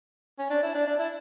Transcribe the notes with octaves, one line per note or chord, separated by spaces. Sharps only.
C#4
D4
E4
D4
D4
E4